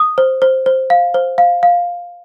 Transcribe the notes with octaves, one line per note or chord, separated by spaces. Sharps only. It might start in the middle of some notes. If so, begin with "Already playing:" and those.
Already playing: D#6
C5
C5
C5
F5
C5
F5
F5